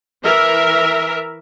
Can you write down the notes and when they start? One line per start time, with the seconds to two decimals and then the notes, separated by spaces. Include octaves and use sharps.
0.24 E3 A#4 E5